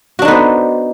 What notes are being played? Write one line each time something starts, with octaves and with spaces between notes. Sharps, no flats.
B3 D4 D#4 F#4 C5